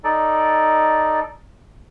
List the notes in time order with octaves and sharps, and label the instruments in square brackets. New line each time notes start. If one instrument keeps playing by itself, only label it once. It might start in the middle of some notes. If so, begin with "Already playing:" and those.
[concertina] D#4 A4 D5